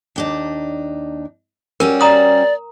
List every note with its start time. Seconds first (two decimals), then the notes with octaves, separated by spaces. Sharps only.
0.16 D#2 D4 D#4
1.80 G3 C#4 F#4 A#4
2.01 D5 A#5 D#6